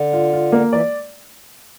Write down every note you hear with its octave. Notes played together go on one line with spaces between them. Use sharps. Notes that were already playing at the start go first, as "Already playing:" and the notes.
Already playing: D3
F4
F4
A#3
E3 D5